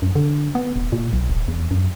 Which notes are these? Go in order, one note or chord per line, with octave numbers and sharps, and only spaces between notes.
F#2
D3
B3
D#1
A#2
B1
D#1
E2
F#2